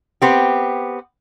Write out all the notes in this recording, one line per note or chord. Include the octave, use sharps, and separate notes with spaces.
B3 C4 G4